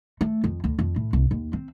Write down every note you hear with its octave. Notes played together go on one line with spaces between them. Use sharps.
A3
F2
D2
F2
A2
C2
D#2
C4